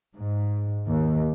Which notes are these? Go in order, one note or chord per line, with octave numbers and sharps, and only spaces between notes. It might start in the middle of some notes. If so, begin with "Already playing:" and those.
G#2
D#2